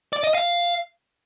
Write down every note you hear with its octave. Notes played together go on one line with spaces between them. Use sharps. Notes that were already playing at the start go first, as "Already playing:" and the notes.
D5
D#5
F5